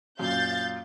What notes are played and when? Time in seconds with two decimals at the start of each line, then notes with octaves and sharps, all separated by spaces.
0.19 F#2 A#2 F5 G6 A6